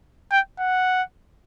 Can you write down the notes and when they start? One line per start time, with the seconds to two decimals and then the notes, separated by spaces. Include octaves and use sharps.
0.31 G5
0.59 F#5